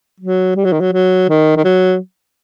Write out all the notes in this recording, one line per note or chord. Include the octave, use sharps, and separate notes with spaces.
F#3
G3
F#3
D#3
F#3
F#3
D#3
D#3
F#3